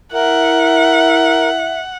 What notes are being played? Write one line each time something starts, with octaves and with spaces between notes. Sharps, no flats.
E4 A#4 E5 F#5